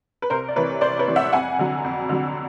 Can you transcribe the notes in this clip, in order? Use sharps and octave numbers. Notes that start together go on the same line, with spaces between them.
B4
C2 A#4 C5
D5
C3 E3 B4 C#5
C2 C5 D5
B4 C#5
C3 E3
E5 F#5
F2 F#5 G#5
D3 F#3
F2
D3 F#3